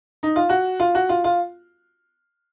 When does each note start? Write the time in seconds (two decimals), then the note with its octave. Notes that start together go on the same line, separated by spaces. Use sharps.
0.23 D#4
0.36 F4
0.49 F#4
0.80 F4
0.95 F#4
1.09 F4
1.24 F4